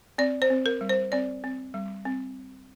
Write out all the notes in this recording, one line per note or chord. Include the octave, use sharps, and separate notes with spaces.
C4 D5
C5
C4
A#4
G3
C5
C4 D5
C4
G3
C4